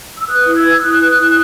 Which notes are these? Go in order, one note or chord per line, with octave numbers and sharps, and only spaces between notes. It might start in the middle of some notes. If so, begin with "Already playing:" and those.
E6
B4 D#6 F#6
E4
E6 G#6
B4
E4 D#6 F#6
B4
E4